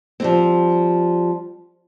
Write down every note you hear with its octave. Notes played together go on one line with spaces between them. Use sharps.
F3 G3 C4